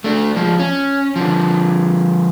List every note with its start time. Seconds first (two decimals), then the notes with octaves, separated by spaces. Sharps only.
0.04 A3 D4
0.36 F3 G#3
0.59 C#4
1.16 D3 F3